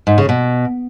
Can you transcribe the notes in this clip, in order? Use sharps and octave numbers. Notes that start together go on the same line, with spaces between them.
G#2
C#3
B2